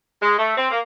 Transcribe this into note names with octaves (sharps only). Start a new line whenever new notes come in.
G#3
A3
C4
A#3